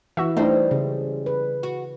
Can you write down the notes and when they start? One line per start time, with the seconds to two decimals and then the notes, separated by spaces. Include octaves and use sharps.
0.17 E3 E4 F#4 E5
0.37 G3 A3 D4 D#4 C5 D#5
0.71 C#3
1.26 B4
1.63 F#4